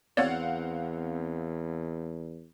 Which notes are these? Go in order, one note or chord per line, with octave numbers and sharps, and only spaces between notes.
E2 B3 C4 C#5 D5 F5 F#5